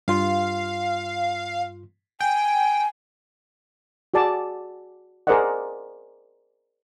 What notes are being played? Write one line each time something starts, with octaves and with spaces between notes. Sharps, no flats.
G2 F4 F5 C6
G5 G#5 G6
F#4 G#4 D5 A5
G#4 A#4 C5 D5 D#5 F#5